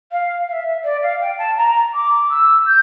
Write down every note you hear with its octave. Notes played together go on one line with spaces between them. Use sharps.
F5
F5
E5
D5
F5
G5
A5
A#5
D6
E6
G6